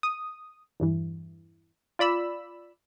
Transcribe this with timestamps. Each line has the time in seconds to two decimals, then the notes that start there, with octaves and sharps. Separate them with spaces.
0.03 D#6
0.80 E2 G2 E3
1.99 F4 D5 B5 E6